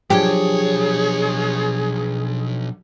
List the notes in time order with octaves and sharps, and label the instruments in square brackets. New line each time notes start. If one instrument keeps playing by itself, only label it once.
[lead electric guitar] B1 C#5 [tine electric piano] F3 F#3 D4 [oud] G4 [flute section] G#4